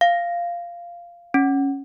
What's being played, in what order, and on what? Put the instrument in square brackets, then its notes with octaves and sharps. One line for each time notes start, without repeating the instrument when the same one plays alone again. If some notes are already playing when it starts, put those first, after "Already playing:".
[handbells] F5
C#4